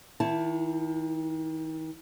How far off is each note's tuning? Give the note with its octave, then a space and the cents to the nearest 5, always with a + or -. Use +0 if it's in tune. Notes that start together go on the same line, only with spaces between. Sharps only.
D#3 +40 E4 +15 A5 +0